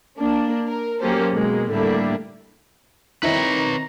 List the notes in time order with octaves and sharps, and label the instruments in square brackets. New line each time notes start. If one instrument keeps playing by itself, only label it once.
[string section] A#3 D4
A#4
F#3 A#3 C#4 G4 A4 C5
B2 G#3 A#3
A2 D3 G3 A#3 D4 E4
[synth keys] D#3 C4 D#4 [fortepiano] E4 [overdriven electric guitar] B4 C#5 [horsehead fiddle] A#5